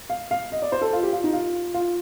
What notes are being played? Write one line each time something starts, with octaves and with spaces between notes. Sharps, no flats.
F5
F5
D#5
D5
C5
A4
F4
G4
F4
D#4
F4
F4